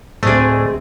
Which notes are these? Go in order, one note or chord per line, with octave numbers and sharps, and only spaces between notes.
D2 A2 G#3 A3 C4 D4 G#4